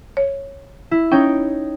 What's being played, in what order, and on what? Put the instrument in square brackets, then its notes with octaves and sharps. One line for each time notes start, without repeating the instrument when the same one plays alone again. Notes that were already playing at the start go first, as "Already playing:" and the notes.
[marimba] C#5
[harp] E4
[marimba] C#4 [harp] D#4 C#5 G5